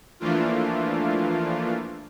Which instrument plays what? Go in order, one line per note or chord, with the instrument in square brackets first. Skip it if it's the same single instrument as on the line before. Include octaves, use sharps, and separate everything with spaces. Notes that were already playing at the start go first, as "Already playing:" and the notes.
[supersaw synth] E3 F3 A3 A#3 D4 F4